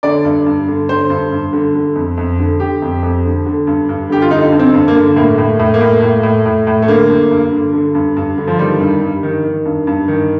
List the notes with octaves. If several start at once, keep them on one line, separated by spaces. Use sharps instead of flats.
D3 D5
G2
G2
D3
D3 C5
G2
G2
D3
D3
F2
F2
D3
D3 G4
F2
F2
D3
D3
G2
G2
D3 G4
F4
D3 D#4
G2
C4
G2
A#3
D3
A2 A#3
A2
A2
A#3
A2
A2
A2
A2
A2
A3
D3 A#3
G2
G2
D3
D3
G2
G2
D3
F3
D#3 G3
G2
G2
D#3
D#3
G2
G2
D#3